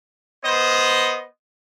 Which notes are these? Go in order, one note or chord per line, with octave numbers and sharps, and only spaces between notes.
B3 C5 D#5